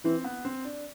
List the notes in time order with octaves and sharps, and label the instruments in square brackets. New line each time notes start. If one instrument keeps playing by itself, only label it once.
[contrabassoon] E3 [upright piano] C4
[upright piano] B3
C4
D4